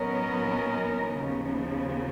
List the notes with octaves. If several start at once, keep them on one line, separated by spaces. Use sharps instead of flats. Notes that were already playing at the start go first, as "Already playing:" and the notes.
Already playing: F#3 B3 C#4 D#4 A#4
D#2 C#3 F3 B3